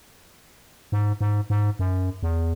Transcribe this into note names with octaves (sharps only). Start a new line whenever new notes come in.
G#2
G#2
G#2
F#2
E2